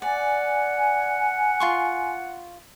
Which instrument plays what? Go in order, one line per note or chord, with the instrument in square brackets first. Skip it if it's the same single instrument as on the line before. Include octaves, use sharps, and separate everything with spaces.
[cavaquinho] D5 [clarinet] F#5 [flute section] G#5
[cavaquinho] F4 C6 C#6